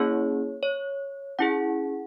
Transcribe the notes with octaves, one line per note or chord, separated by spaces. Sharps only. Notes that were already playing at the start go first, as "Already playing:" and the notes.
Already playing: A#3 C#4 E4 G#4 C#5
C#5
C#4 E4 G#4 F#5